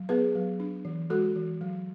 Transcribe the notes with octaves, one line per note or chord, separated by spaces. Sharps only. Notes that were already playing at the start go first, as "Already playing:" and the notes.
Already playing: F#3
B3 G#4 B4
F#3
D4
E3
G#3 F#4 A4
E3
F#3